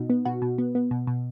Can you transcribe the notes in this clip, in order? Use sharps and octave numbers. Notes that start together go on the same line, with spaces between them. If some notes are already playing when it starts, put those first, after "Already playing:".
Already playing: B2 D#4 F#4
B3
B2 F#4
B2
B3
B3
B2
B2